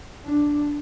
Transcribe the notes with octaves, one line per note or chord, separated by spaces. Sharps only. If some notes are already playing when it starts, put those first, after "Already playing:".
D4